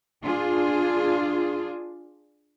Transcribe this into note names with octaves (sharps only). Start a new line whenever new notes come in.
D4 F4 G#4